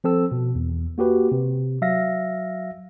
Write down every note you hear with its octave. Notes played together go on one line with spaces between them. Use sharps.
F3 C4 A4 E6
B2
E2
A#3 F#4 G4 B4
C3
F#3 E5 F5 A#6